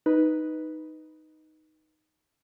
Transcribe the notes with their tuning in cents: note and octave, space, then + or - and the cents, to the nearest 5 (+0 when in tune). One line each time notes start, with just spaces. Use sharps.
D#4 +0 B4 +0